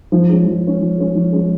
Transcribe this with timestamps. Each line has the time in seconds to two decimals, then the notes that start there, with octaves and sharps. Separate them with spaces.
0.12 F3
0.29 G#3 C#4
0.46 F3
0.64 G#3 C#4
0.81 F3
0.98 G#3 C#4
1.15 F3
1.32 G#3 C#4